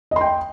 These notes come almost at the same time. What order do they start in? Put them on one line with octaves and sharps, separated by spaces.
D#5 C6 G5